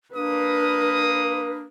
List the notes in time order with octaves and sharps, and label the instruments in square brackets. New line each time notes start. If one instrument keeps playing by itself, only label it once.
[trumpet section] A#3 D#6 [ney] D4 [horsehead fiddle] B4